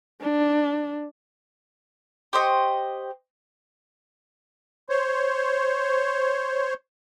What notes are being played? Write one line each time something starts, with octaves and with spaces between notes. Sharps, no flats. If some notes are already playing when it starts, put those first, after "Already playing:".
D4
G4 C5 D#5 C#6
C5 C#5